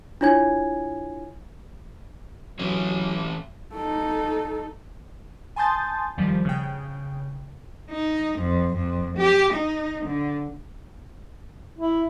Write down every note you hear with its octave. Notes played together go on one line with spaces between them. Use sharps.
D4 E4 F4 C#5 G#5 G#6
E3 F#3 C#4 C#5
D#4 A4
G#5 A5 C6 D#6 G6 A6
D#2 D#3 F3 G3
C#3 G5
D#4
F2
F2
G4
D#4
D3
E4